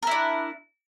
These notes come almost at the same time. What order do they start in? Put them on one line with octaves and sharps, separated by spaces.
A#4 E4 D4